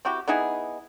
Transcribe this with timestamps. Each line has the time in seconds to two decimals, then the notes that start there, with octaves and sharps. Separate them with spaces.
0.05 C4 E4 F#4 G4
0.28 B3 D#4 E4 G#4